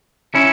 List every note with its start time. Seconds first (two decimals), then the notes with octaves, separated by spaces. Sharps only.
0.35 C#4 E4